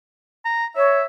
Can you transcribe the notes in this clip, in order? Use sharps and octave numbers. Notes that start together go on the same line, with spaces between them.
A#5
C#5 E5